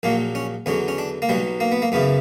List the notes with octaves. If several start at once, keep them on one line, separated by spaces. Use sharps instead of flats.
A#1 A#2 F#3 A#3
C#4
E2 D3 F#3 C#4
C#4
D4
A#3
B1 B2 F#3 G3
A#3
B3
A#3
F#2 C#3 E3 B3